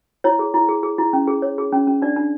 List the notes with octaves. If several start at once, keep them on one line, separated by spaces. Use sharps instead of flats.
E4 C#5
G#4
E4
G#4
G#4
E4
C#4
G#4
C#5
G#4
C#4
C#4
D4 D5
D4